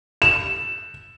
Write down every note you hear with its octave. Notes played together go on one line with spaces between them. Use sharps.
E7